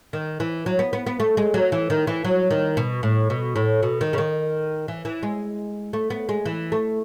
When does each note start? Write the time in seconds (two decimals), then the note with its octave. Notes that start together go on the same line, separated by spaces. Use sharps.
0.13 D#3
0.40 E3
0.66 F#3
0.79 B3
0.93 B3
1.06 B3
1.20 A3
1.37 G#3
1.54 F#3
1.72 E3
1.90 D#3
2.07 E3
2.24 F#3
2.51 D#3
2.77 B2
3.03 A2
3.30 B2
3.56 A2
3.82 B2
4.01 D#3
4.13 C#3
4.18 D#3
4.88 E3
5.05 E3
5.23 G#3
5.93 A3
6.10 B3
6.29 G#3
6.45 E3
6.72 A3